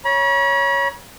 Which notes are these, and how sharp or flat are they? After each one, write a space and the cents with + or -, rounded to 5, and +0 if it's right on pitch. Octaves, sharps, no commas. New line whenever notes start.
C#5 +0 B5 -45